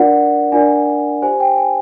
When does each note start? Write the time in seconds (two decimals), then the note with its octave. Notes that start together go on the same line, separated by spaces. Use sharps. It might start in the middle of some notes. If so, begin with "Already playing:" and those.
Already playing: D4 F4 A#4 D5 F#5
0.52 D4 F4 A#4 D5 G#5
1.22 G4 C5 G#5
1.40 G5
1.58 G#5